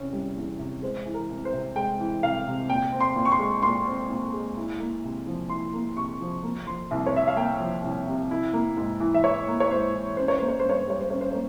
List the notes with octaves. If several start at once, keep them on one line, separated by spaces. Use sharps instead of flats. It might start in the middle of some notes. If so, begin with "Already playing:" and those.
Already playing: E2 C3 C#4
G3
E2
C3
G#3 C5
E3
A#4
C2
C5
C3
G#3 G5
E3
C2 F5
C3
A#2 G5
C4
C6
A#2
C#6
C6
G#3
A#2 C6
C4
A#2
G#3
E4
A#3
C3
F3
E4 C6
A#3
C3 C#6
F3
A#3
F3 C6
C2
C#5
C3 E5
F5
A#3 G5
F3
C2
C3
E4
A#3
G#2
E3
E5
E4 C#5
A#3
C#5
G#2 C5
E3
C#4 C5
C#5
A#3 C5
C#5
C5
G2 C#5
C5
G3 C#5
C5
C#4 C#5
C5
A#3 C#5